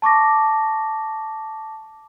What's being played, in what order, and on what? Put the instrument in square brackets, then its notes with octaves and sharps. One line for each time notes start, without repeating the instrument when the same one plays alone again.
[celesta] A5 C#6 D6 A#6